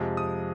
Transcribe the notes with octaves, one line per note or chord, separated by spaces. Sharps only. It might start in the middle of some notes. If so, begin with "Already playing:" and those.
Already playing: F2 C3 F3 G#3
D#6